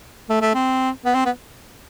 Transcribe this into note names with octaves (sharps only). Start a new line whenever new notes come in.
A3
A3
C4
B3
C4
B3